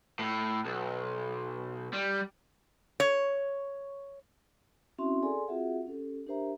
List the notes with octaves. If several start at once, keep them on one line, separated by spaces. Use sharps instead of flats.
A2
B1
G3
C#5
C4 C#4 E4 F#4 E5 C6
G#4 A4 D5 G#5 C6
C4 F4 F#4 G#4 E5 F#5
C#4 G4 A4
D4 G4 A#4 C5 E5 A#5